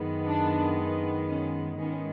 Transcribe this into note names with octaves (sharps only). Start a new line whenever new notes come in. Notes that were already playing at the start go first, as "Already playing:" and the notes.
Already playing: F#2 D#3 G#3 B3
D4
C#4
G#2 D#3 G#3 B3 C#4